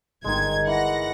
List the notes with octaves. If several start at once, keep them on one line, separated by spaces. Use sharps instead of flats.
G1 D#3 G#3 G#6
E3 F#5 A#6